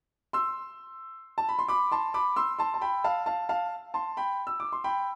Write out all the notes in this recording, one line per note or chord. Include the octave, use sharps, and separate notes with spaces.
C6 E6
A5
B5
C6
B5 D6
A5 C6
B5 D6
C6 E6
A5 C6
A5
G5 B5
F5 A5
F5 A5
F5 A5
A5 C6
G5 B5
E6
D6
C6
G5 B5